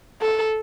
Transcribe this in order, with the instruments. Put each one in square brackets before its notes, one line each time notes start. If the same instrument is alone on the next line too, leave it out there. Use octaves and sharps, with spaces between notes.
[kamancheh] A4